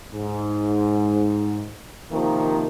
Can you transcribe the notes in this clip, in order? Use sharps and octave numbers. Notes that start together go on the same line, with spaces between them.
G#2
C3 D#3 F3 A#3